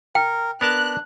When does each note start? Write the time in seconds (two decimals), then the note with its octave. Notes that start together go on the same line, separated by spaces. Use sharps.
0.15 A#4 G5
0.61 B3 D4 A#4 A5 F#6